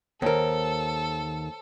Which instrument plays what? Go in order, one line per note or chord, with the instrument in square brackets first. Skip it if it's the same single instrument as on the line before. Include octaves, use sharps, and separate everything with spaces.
[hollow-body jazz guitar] D#2 A#4 [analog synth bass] D#3 [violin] A4 [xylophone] C5 C#5